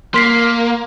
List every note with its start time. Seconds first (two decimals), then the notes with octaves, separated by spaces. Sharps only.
0.14 A#3 C6 B6 C7